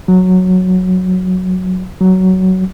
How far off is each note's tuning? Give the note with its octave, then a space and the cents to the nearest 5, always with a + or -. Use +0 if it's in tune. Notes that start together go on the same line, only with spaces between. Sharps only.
F#3 -5
F#3 +15